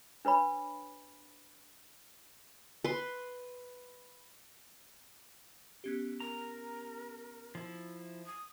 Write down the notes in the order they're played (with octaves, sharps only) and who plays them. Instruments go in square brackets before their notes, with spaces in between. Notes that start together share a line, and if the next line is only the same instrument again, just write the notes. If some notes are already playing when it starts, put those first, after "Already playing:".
[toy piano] D4 B4 C#5 B5
[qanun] B4 C6
[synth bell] B3 C#4 G4
[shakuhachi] A#4 [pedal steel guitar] A#5
[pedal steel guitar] F3 E4
[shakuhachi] D#6